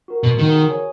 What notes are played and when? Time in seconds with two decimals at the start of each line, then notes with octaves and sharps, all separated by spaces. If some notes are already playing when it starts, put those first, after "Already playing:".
0.08 F#4 A#4
0.23 B2 B3
0.39 D#3 F#4 A#4
0.54 G#4
0.70 C#5 G#5